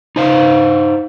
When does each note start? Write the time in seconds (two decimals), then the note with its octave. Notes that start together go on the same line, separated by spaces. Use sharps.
0.16 D#4 C5 F5